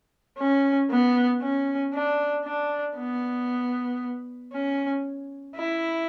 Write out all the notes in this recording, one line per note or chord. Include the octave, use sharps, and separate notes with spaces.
C#4
B3
C#4
D4
D4
B3
C#4
E4